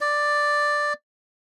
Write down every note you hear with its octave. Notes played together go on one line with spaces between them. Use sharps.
D5